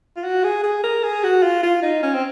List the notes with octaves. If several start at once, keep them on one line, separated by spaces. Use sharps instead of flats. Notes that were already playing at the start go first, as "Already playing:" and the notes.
F4
F#4
G#4
G#4
A#4
G#4
F#4
F4
F4
D#4
C#4
C4